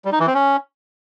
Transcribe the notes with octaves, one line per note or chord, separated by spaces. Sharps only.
G3
D#4
E3
C4
C#4